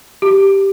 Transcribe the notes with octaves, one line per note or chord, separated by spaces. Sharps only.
G4